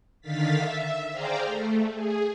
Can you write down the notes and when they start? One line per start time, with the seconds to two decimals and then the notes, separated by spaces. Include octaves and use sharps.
0.21 D3 D#3 F5 A6 B6
0.57 E5
1.11 G#4 C5 D5 F5 G5 A#5
1.45 A3
1.94 G#4